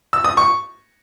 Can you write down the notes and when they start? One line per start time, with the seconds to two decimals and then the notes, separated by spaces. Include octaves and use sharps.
0.13 E6
0.24 D#6
0.37 C#6